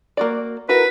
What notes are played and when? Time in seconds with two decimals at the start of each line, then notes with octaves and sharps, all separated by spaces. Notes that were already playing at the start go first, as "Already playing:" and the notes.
0.17 A#3 F#4 D5
0.69 E4 F#4 A#4 B4